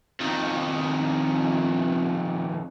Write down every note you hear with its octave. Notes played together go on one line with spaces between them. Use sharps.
F2 D#3